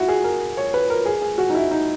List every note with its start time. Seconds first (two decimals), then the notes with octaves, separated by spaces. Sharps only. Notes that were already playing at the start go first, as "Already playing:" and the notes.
Already playing: E4 F#4
0.08 G#4
0.24 A#4
0.57 C#5
0.74 B4
0.90 A#4
1.06 G#4
1.21 G#4
1.38 F#4
1.50 D#4
1.54 E4
1.71 D#4